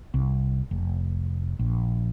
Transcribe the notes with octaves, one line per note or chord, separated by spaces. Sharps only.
C2
F1
A#1